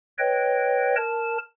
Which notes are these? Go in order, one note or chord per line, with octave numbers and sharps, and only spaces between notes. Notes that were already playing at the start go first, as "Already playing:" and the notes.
B4 C#5 D#5 G5
A#4 A5